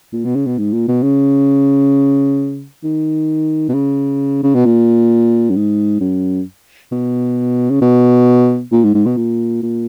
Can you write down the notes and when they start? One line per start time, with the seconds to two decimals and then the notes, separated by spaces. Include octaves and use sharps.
0.13 A#2
0.25 B2
0.35 C#3
0.47 B2
0.58 G#2
0.73 A#2
0.88 B2
1.03 C#3
2.84 D#3
3.69 B2
3.74 C#3
4.43 C#3
4.55 B2
4.65 A#2
5.50 F#2
5.56 G#2
6.01 F#2
6.92 B2
7.71 C#3
7.82 B2
8.72 A#2
8.84 G#2
8.95 G#2
9.06 B2
9.17 A#2
9.62 A#2